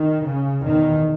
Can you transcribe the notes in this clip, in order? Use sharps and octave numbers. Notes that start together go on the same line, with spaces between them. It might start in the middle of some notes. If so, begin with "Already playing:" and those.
Already playing: D#3
C#3
E2 B2 D#3